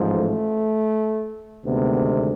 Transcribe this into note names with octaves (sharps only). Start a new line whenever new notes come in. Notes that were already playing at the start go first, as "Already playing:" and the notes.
Already playing: A1 G#2 F3
A3
D2 C3 D#3 G#3 B3